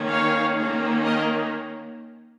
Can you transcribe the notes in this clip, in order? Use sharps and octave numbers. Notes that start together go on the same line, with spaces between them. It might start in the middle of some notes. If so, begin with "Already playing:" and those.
Already playing: D#3 A#3 C#4
C#5 F5
D#3 A#3 C#4
A#4 D#5